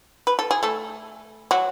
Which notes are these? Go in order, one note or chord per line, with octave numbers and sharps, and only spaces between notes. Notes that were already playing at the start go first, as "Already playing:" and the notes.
B4
A4
G#4
A3 A4
F#3 F#4